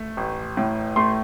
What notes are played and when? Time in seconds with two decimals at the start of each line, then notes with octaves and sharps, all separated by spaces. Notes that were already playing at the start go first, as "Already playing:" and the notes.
Already playing: A3
0.17 A1
0.57 A2
0.96 A3 C6